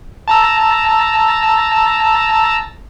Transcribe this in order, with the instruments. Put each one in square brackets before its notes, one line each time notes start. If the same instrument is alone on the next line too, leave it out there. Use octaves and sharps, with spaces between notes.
[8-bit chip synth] A5 A#5 E6